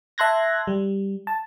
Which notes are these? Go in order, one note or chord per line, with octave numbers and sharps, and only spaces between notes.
E5 A5 C6 F#6 G#6 A#6
G3
A5